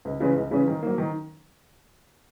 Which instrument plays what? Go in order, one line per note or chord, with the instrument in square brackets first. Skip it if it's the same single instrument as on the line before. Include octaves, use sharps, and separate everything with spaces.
[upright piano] C#2
C#3 E3 G#3 C#4
C#2
C#3 E3 G#3 C#4
D#3
F#3 A#3
D#3